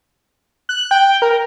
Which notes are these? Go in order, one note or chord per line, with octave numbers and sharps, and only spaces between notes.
F#6
G5
A#4